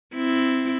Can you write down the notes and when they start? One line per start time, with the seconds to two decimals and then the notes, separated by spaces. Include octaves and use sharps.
0.14 C4 E4